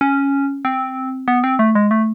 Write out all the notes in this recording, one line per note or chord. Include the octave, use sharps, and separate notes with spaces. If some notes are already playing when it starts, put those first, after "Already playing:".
C#4
C4
B3
C4
A3
G#3
A3